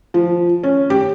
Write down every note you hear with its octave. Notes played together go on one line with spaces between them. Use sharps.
F3
C#4
G4